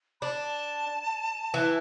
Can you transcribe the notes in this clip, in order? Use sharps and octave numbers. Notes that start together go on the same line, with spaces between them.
D4 A5 B5
E3